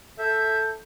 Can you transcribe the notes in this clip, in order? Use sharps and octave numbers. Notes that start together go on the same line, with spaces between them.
A4 E5 G6